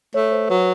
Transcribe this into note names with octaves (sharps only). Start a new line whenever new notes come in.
A3 C#5
C5
F#3 B4